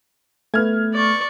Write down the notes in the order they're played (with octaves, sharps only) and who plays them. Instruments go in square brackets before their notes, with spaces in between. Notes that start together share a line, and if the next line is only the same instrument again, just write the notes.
[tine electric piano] A3 [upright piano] B3 F6 G#6
[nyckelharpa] D5 C#6